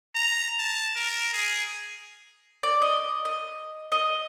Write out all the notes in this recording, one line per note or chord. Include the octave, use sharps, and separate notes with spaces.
A#5
A5
A#4
G#4
D5
D#5
D#5
D#5